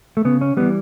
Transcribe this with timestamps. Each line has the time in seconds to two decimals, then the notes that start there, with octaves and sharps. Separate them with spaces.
0.17 A3
0.25 C#3 B3
0.41 C#4
0.57 E3 G3 B3